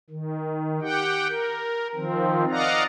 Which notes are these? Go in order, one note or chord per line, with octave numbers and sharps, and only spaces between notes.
D#3
G4 F#5 G5
A#4
D#3 F3 C4
D5 D#5 F5 F#5 A#5